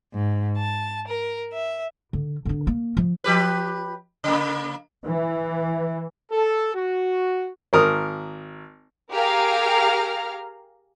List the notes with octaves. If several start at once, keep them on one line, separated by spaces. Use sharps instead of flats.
G#2
A5
A#4
E5
D3
D3 D4
A#3
F3
F3 G4 B4
C#3 A#3
E3
A4
F#4
G#1 A#4 D#6
G4 G#4 A#4 F5 A#5 F6